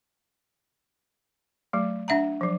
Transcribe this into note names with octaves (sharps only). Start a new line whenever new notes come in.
F#3 A3
D4 E5 F#5 A#5
F3 F#3